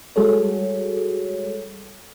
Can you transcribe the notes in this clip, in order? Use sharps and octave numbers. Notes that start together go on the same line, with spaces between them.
G3 G#3 F#4 G#4 A4 C#5